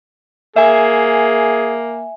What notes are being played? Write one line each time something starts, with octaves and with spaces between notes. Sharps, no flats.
A#3 G#4 E5 G#5